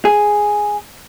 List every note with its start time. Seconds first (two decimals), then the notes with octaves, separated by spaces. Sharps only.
0.05 G#4